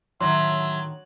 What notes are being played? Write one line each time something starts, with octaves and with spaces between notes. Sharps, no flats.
A2 D3 D#3 F#3 E5 C6